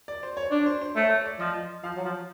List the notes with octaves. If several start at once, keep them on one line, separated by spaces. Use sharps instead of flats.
D5
C5
C#5
D4 C#5
C5
C5
A3 C#5
C#5
D5
F3 D#5
D#5
F3 F5
F#3
F3